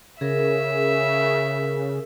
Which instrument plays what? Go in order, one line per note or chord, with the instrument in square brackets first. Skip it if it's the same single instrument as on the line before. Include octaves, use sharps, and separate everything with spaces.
[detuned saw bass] C#3 [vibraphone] G#4 A#4 [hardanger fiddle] E5